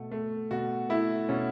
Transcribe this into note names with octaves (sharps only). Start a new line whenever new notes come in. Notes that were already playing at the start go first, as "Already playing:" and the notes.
Already playing: B2 A3
A3
B2 F#4
A3 E4
B2 C#4